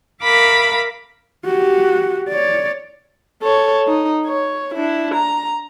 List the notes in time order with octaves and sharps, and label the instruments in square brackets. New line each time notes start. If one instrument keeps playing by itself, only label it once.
[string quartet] A#4 E5 F5 B5 D6
[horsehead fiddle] F#4 G4
C#5 D5
[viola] A4 C#5
D#4
C#5
D4 E4
A#5